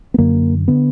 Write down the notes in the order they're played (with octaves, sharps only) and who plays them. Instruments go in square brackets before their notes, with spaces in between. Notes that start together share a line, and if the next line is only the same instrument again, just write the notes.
[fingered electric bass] B3
F#2 D3 A#3
D3 B3